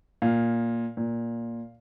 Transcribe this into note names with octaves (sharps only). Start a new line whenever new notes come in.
A#2 F5
A#2